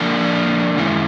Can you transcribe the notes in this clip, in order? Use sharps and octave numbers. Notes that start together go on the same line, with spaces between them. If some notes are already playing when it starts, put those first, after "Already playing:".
Already playing: D3 F3 A#3 D4 A#4
F#2 D#3 G#3 C#4 E4